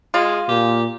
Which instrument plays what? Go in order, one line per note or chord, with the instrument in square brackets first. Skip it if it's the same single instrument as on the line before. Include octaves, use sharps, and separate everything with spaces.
[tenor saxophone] G#3 [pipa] F4
[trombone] A#2 [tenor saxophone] G4